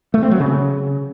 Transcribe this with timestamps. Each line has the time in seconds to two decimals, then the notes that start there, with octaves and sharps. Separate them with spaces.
0.14 A3
0.23 C4
0.31 F#3
0.40 C#3